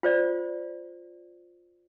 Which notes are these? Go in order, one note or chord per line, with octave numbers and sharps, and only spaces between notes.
F4 C5 D5